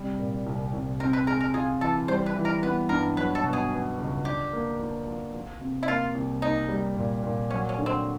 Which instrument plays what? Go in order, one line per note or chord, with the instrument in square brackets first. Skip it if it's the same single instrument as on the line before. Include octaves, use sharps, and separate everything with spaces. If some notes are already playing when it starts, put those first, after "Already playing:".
Already playing: [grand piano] C3 G3
A#2
C2
C2
[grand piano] C4 [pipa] A#4
[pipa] B4
[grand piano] G#3 [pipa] A#4
[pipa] A#4
[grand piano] F4 [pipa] G#4
[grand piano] E3 [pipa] A4
[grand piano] G3 [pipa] C5
[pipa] B4
[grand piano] E3
[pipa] A#4
[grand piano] B3 [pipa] B4
[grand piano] G2 [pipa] A#4
[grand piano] F#3 [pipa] B4
[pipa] A4
[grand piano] B2
[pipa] G#4
[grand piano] B3
C#2
[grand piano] D4 [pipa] G4
[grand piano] A#3
F3
F3
F3
C3
[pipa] E4
[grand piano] A#3 [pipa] F4
[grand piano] C2
[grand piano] A#3 [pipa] D#4
[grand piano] G3
A#2
A#2
[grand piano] F#3 [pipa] C#4
[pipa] C#4
[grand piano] D3
[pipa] C4